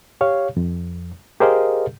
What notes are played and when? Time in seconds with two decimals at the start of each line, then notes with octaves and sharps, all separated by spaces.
0.21 G4 C#5 F5
0.57 F2
1.40 G4 G#4 A#4 C5 D#5 F5